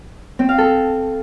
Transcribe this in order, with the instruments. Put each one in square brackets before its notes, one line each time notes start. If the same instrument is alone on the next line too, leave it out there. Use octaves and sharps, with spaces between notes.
[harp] C4
F5
A4